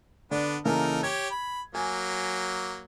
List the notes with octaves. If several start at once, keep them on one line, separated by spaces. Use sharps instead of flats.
D3 B3 D4
C#3 E3 A#3 D#4 A4 A#4
G4 C#5 G#6
B5
F#3 A#3 G#5